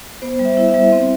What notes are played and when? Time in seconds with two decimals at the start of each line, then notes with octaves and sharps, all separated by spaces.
0.22 B3 C5
0.39 G3
0.45 E5
0.57 E4
0.68 E5
0.74 G3
0.92 C4